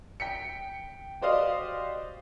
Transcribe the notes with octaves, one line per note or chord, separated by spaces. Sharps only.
G5 B6 C#7
F#4 G4 C5 D5 D#5 F5